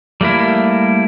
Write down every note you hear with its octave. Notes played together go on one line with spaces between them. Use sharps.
G3 A3 A#3 E4